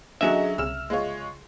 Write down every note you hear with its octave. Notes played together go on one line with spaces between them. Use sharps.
D3 F#3 C#4 F#4 G#4 D#5 E5
C2 C#3 E6 F6 E7
G#3 F4 C#5